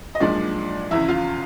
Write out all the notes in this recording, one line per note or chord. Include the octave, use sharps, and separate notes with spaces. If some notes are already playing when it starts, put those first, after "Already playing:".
D#5
B1 A#2 F3 G#3 D4 D5
F1 E2 C#3 E4 E5
F4 F5